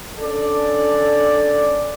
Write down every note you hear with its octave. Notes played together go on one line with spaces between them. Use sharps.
C#4 D4 A4 D5